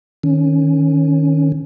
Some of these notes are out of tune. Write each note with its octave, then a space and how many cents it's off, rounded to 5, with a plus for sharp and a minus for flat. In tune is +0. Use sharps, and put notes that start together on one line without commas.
D#3 +0 C#4 +0